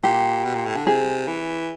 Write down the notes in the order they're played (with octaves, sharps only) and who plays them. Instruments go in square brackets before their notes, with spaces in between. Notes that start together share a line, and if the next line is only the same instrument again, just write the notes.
[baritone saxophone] A#2 [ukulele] G4
[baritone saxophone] B2
A#2
A2
D3
[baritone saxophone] C3 [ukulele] G#4
[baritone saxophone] E3